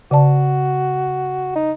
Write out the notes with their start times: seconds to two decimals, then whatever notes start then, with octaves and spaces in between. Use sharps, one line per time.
0.11 C#3 F#4 D5 A5
1.56 D#4